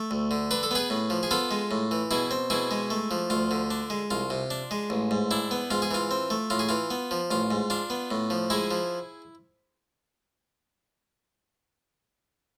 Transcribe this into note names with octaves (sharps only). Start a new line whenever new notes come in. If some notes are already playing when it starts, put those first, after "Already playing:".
Already playing: A3
D2
D3
D4 B4
A4
B3 G#4 B4
A2
F3
G#4
B3 F4 A4
G#3
A2
E3
B2 E4 G#4
C4
B2 E4 G#4
G#3
A3
F3
D2 F4
D3
D4
G#3
C2 F4
C3
D4
G#3
A1
G#2
D4 E4
B3
G#2 F4
G#4
E3 F4
C4
A3
A2 F4
G#4
E3 F4
B3
F3
A1 F4
G#2
D4 F4
B3
A2
F3
G#3 E4 G#4
F3